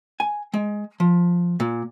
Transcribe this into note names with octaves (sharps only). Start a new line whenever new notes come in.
G#5
G#3
F3
A#2